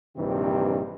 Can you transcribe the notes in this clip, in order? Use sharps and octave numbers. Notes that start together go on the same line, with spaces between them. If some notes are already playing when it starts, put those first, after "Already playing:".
A#1 G2 C3 D#3 E3 C4